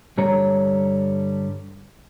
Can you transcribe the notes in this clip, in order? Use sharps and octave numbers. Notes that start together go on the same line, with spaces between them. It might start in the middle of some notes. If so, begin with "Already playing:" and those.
G2 D3 G3 C#5 A#5